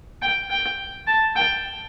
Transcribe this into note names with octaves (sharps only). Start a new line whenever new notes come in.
G5
G5
A5
G5